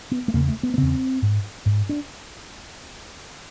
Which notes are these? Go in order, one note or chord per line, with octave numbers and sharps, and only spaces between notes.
B3
A3
E2 C#3 A#3
A3
B3
B3
E2 C#3 C4
G#2
G#2
D4